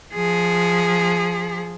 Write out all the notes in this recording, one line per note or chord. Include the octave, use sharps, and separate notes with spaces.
F3 G#4